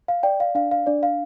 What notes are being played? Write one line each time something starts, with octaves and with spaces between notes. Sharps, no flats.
F5
D5 G5
F5
D4 F5
F5
D4 D5
F5